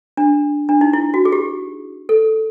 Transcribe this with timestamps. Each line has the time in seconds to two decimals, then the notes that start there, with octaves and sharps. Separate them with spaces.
0.17 D4
0.69 D4
0.81 D#4
0.93 E4
1.14 F#4
1.25 G#4
1.32 G4
2.09 A4